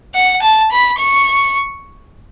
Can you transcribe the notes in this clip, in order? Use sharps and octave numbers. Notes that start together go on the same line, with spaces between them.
F#5
A5
B5
C#6